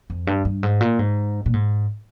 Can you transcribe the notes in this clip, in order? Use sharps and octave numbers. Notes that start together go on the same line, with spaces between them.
F2
G2
G2
G#2
A#2
G#2
A#2
G#2